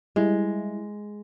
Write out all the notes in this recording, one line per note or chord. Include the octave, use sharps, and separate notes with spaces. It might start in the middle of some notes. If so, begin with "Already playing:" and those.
G3 G#3 E4